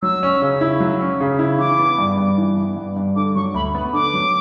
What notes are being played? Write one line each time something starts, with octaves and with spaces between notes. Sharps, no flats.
F#3 E6
C#4
C#3
E4
F#3
C#4
C#3
E4
E3 D6
B3
G2
G2
E3
B3
G2
G2
D3 D6
F#3 C#6
D2 B5
B3
D3 D6
F#3